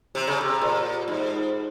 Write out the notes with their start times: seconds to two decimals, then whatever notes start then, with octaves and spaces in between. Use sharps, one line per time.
0.15 C3
0.27 C#3
0.41 C3
0.61 A#2
1.08 G#2